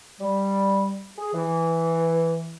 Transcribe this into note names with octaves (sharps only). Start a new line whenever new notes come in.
G3
G#4
E3